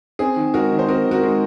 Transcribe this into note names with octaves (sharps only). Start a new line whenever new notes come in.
C4 G#4
D#3
G#3 F#4 A#4
D#3
C5
C4 F#4 A#4
D#3
F#4 A#4
G#3